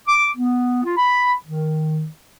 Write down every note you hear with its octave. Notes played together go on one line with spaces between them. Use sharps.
D6
B3
F4
B5
D#3